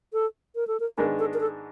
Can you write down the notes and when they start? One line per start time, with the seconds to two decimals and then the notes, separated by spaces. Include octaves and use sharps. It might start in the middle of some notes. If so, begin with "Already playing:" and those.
0.13 A4
0.55 A#4
0.67 A4
0.80 A#4
0.98 G#2 D#3 G#3 B3 D4 A#4
1.19 A4
1.34 A#4
1.40 A4